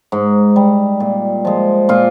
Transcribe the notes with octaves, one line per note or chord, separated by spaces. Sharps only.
G#2
G3
A#2
F3 G#3
A#2 F4